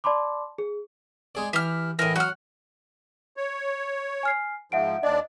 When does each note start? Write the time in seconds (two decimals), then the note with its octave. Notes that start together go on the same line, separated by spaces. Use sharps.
0.04 D5 A5 B5 C6 D6
0.58 G#4
1.35 G#3 G#4 D5
1.53 E3 G4 F6
1.99 A2 E3 A#4 D#5
2.16 F#3 F#5 F6
3.37 C#5
4.23 G#5 F6 C7
4.72 G#2 F3 E5 F#5 D7
5.03 D#2 D4 D5 D#5